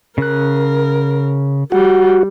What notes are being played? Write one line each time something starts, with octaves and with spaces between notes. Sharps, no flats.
C#3 A#4 F#6
G3 F#4